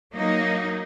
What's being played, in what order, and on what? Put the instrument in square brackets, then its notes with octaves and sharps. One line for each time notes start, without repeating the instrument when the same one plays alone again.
[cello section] F#3 A#3 D#4